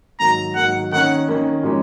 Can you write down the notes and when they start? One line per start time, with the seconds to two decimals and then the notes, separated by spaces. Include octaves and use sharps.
0.20 G#2 D#3 F#3 A#3 A#5
0.56 G#2 D#3 F#3 A#3 F#5
0.92 D#3 A#3 C#4 F#5
1.28 D#3 A#3 C#4
1.63 A#2 F3 G#3 C#4